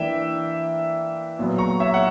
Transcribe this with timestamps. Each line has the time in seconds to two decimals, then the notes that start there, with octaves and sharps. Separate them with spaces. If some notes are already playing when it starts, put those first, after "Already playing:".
Already playing: E3 A#3 D4 E5 G5
1.39 A#2 F#3 B3
1.58 A#5 C#6
1.80 C#5 E5
1.94 F#5